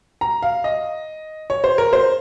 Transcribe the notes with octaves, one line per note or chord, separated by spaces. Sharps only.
A#5
F5
D#5
C#5
C5
A#4
C5